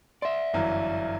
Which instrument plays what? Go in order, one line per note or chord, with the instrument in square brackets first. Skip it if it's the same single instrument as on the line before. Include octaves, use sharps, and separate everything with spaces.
[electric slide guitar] D5 E5 [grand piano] C6
[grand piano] G1 F#2 E3